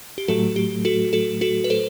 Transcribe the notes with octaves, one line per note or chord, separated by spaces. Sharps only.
G4
A2 F#3 A3 F#4 A4
G4
F#4 A4
F#4 A4
F#4 A4
B4
A4 C5